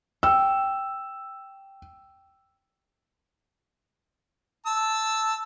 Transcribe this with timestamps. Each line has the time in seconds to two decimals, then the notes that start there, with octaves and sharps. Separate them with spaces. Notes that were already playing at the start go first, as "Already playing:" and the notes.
0.23 G5 E6 C#7
4.66 A5 E6